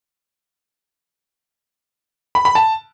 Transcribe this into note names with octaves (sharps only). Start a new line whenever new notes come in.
B5
B5
A5